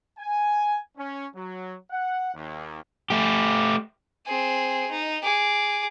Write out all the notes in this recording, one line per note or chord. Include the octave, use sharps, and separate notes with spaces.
G#5
C#4
F#3
F#5
D#2
A3 G4
C4 G#4
D#4
G#4 D6